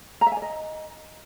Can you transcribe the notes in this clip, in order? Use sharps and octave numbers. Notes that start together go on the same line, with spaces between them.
A#5
E5
G#5
D5
D#5